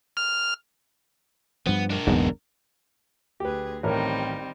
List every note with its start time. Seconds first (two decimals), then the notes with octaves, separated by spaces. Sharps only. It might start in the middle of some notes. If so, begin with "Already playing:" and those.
0.17 F6
1.67 G2 F3 B3
1.90 D4 A#4
2.07 F#1 B1 E2 G#2 B3
3.40 D2 G4 G#4 B4
3.83 A1 D#3 G3 C4 A#4 C#5